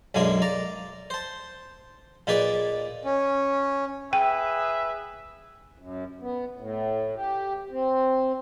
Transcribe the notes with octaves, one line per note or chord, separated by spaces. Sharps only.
B1 F#2 G#3 A#3 D4 G#4
D5 A#5
C5 A5
A#2 D#4 G#4 B4 D5
C#4
G#4 B4 E5 G5
F#2
B3
A2
G4
C4